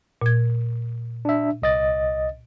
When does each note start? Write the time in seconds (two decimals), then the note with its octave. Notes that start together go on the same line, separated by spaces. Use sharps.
0.21 A#2 G#6
1.25 D4 E5
1.62 C2 D#5 A6